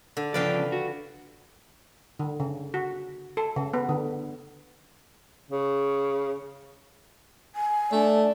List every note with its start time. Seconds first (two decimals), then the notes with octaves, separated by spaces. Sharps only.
0.17 D3
0.34 C#3 F3 B4 D5 F5 G5
0.72 F#4
2.19 D3
2.40 C#3
2.74 F#4
3.37 A4
3.56 C#3
3.73 B3
3.89 D3
5.51 C#3
7.56 G#5
7.92 A3 D4